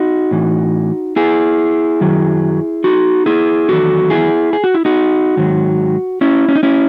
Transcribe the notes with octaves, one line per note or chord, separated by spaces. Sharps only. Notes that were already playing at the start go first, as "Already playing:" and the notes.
Already playing: D#4 F#4
A2 E3
E4 G#4
F#2 D#3 F#3
D#4 F#4
E4 G#4
E2 D#3 F#3 F#4 A4
E4 G#4
G#4
F#4
E4
D#4 F#4
G#2 D#3 F#3
C#4 E4
C#4
D#4
C#4 E4